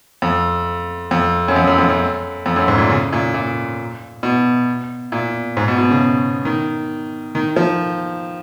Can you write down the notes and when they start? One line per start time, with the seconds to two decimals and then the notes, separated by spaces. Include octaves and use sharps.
0.22 F2
1.11 F2
1.48 F#2
1.56 F2
1.67 F#2
1.78 F2
1.89 F#2
2.46 F2
2.56 F#2
2.68 G#2
2.78 A#2
2.90 C#3
3.13 A#2
3.34 A#2
4.23 B2
5.12 A#2
5.57 G#2
5.68 B2
5.78 B2
5.91 C#3
6.45 D#3
7.35 D#3
7.56 F3